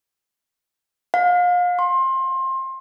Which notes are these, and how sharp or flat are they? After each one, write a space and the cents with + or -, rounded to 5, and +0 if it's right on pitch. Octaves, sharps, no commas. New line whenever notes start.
F5 +35
C6 +25